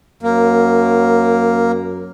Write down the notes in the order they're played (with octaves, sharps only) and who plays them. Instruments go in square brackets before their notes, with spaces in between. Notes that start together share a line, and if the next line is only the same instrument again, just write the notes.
[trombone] F#2 [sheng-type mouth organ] A#3